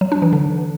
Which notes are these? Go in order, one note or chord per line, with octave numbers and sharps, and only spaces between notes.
F#3
D4
E3
D3